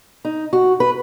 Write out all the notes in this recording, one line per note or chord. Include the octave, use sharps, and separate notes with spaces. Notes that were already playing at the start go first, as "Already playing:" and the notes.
D#4
F#4
B4